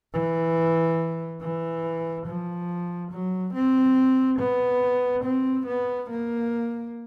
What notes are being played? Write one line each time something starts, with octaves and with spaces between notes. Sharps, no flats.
E3
E3
F3
F#3
C4
B3
C4
B3
A#3